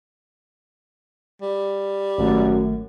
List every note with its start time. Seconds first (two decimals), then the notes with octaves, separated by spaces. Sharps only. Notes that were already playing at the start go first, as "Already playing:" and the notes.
1.42 G3
2.18 G#1 F#2 A3